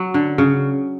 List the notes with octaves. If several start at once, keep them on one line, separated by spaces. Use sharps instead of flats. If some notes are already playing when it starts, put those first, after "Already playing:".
Already playing: F#3
D3
C#3